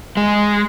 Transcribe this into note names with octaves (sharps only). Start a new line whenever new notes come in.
G#3